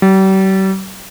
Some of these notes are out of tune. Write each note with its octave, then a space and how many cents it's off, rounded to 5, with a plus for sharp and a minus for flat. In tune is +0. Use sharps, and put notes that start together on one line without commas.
G3 -40